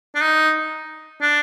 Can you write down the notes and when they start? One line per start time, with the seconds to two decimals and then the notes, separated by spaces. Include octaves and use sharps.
0.15 D4
0.22 D#4
1.21 D4